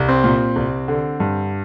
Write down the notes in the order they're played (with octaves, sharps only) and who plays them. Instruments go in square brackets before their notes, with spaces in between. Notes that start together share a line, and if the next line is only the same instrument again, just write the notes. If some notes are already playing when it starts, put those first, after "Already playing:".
Already playing: [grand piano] C2
C4
A#2
C2
D3
G2